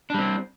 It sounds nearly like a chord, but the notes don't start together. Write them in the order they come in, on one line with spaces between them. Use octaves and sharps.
D4 G3 C4